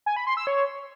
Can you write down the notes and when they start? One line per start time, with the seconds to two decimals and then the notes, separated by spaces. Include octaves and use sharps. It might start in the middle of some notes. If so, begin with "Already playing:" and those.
0.06 G#5
0.16 B5
0.27 C6
0.37 E6
0.47 C#5